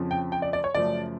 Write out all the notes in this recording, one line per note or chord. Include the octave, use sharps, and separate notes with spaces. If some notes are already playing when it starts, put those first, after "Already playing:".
Already playing: F2 C#3 F3
G5
G5
D5
D5
C#5
F#2 C#3 F3 A3 D5